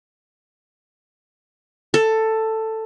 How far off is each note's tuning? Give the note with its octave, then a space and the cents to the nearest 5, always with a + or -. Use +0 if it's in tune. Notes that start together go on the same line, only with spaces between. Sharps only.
A4 +10